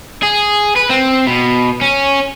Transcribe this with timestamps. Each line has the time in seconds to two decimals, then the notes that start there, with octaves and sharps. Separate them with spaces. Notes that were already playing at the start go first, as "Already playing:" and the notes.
0.23 G#4
0.77 B4
0.90 C4
1.27 B2
1.81 C#4